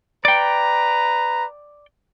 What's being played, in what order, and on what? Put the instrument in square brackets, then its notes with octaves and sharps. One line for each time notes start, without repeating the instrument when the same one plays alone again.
[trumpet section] B4 A#5 [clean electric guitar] D5 G5